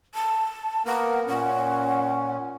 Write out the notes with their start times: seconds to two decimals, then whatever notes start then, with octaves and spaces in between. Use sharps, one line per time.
0.15 A5
0.86 A#3 B3 A#4 F#5
1.28 A#2 C#4 F#5